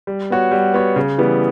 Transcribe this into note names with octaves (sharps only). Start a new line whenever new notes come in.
G3
B3 F#4 C#5
G3
B3 F#4 C#5
C#3
E3 G3 B3